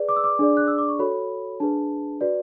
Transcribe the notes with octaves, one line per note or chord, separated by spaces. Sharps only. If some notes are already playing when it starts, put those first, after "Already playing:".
Already playing: G#4 B4 D5
D6
E6
D6
D4 G#4 D5
F#6
E6
D6
C#6
F#4 A4 C#5 B5
D4 G#4 B4 A5
F#4 B4 D5